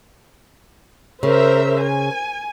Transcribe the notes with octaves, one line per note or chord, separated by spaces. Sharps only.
C#3 A#4 C5 E5
G#5